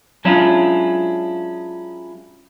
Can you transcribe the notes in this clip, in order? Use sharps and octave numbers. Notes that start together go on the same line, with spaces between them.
F#3 G#3 C#4 D4 E4 F4